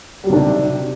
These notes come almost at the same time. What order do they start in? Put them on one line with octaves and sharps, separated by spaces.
G3 F#3 D#3 D4 C3